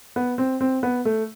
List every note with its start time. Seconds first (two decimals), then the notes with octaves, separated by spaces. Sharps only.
0.16 B3
0.38 C4
0.61 C4
0.83 B3
1.05 A3